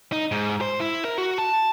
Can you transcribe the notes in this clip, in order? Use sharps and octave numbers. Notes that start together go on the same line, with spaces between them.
D#4
G#2
C5
E4
A#4
F#4
A5